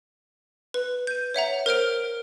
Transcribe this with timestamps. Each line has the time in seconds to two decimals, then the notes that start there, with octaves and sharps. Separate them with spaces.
0.74 B4
1.07 G6 D#7
1.34 C#5 E5 F#5 A#5
1.66 A#4 C5 F6 D7